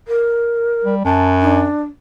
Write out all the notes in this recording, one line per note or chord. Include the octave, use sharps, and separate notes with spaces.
A#4
G3
F#2 A5
D4